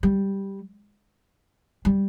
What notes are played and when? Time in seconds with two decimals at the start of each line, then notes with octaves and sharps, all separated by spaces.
0.03 G3
1.85 G3